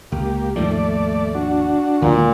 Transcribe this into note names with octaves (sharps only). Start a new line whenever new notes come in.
C#2 A#3 G4
D#2 G#2 F3 A3 D5
D4 F#4
D2 A#2 D#3 G#3